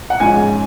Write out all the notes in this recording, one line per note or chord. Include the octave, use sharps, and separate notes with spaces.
F#5
A#1 G#2 G#3 C#4 G#5